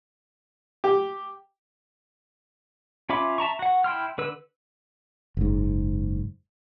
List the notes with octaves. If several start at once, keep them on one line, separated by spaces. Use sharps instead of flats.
G4
C#4 F4 E5 B5 D6
E5 A5 A#5 C#6
F#4 F#5
E4 G5 C6 F6
D3 B4 E6
F#1 G#2